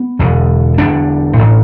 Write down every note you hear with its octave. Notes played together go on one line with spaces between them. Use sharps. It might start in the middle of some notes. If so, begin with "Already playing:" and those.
Already playing: B3
E1 E2 D3
E1 E2 D3 D4
A1 A2